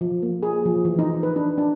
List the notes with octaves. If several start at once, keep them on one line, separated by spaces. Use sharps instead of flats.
F3
A#3
G#4
F3
E3
D#4
B4
D4
D4